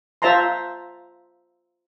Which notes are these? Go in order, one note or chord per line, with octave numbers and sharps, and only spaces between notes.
F4 C5 E5 A5 A#5 C6